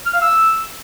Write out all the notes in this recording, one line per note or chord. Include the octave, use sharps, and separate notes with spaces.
F6
F5
E6